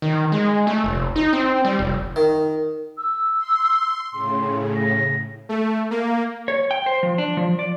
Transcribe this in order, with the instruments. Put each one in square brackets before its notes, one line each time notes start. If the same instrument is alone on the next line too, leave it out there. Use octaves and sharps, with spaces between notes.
[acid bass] D#3
G#3
A3
F1
D#4
C4
G3
F1
[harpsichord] D#3
[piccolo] E6
[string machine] C6
[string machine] A2 C#3 [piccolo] C6
[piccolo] A#6
[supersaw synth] A3
A#3
[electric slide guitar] C#5
G5
C5
F3
D4
F3
D5